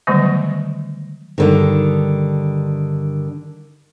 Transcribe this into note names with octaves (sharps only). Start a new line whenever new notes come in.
D3 D#3 F#3 G3 A3 B3
G2 D3 D#3